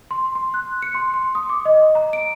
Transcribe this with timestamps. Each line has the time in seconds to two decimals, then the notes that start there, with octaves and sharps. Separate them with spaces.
0.11 C6
0.35 C6
0.54 F#6
0.82 C#7
0.95 C6
1.14 C6
1.35 D#6
1.49 D6
1.65 D#5
1.95 A#5
2.13 D7